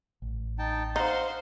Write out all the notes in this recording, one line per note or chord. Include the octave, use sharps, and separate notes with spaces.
A1
D#4 G5 A5
D#4 C5 F5 F#5 C6